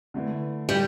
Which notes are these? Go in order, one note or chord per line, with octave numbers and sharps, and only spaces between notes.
D3 A3 E4 B4
G3